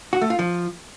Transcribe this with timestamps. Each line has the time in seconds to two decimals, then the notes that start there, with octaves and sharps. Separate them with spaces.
0.13 F#4
0.21 A3
0.30 F4
0.39 F3